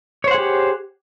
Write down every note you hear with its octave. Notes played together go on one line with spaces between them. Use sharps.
G4 G#4 C5 C#5 F#5